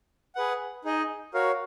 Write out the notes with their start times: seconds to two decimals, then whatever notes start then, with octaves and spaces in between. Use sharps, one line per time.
0.35 G#4 B4 F#5
0.85 D#4 G#4 D#5
1.34 F#4 A#4 C#5 F5